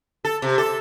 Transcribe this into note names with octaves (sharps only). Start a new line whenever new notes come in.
A4
C3
A4